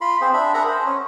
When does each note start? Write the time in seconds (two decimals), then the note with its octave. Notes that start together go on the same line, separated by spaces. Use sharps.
0.01 F4 B5 C6
0.21 C4 G#4 C5
0.34 D4 E5 B5
0.54 G#4 A#4 E5 F#5 A#5 B5
0.68 C5
0.85 C#4